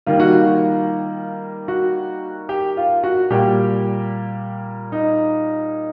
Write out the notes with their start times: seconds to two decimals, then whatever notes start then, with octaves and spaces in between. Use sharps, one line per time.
0.06 D#3 G3 A#3 F4
0.20 F#4
0.32 F4
1.68 F#4
2.49 G4
2.77 F4
3.03 F#4
3.31 A#2 G3 A#3 G4
4.92 D#4